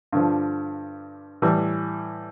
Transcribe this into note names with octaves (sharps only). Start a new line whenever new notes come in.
G2 D3 F3
A2 E3 G3